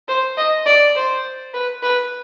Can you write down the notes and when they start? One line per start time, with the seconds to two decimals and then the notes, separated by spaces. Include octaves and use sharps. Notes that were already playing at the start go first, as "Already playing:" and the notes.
0.08 C5
0.37 D#5
0.66 D5
0.95 C5
1.53 B4
1.82 B4